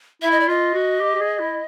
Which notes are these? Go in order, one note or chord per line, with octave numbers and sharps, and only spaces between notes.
E4 E5
D#5
D5
F4 D#5
F#4
G4
G4
G#4
E4